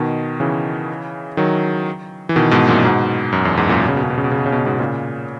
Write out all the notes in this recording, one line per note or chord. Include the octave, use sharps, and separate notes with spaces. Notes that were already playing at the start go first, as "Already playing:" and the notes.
Already playing: B2 D#3
C#3 E3
D#3 F#3
E3
B2 D#3
G#2 B2
F#2 A#2
G#2 B2
F#2
E2
E2 G#2
F#2 A#2
B2
C#3
B2
C#3
B2
C#3
B2
C#3
B2
C#3
B2
C#3
G#2 B2
A#2 C#3